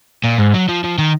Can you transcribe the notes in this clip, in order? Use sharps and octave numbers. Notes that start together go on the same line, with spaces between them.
A#2
G#2
F#3
F3
F3
D#3